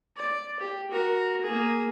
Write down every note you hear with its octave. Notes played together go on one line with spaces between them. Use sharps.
D5
G4
F#4 A#4
A#3 G#4